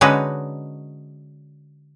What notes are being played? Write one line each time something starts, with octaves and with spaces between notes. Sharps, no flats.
D3 G#3 C#4 D#4 F#4 B4